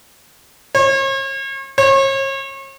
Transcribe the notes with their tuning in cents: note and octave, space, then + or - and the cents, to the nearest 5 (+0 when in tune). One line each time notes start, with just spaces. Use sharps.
C#5 -45
C#5 -40